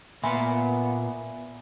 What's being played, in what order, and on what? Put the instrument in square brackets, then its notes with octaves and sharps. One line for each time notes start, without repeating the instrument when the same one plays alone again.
[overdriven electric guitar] A#2 C6 [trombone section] B3 [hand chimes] E5 G#5 B5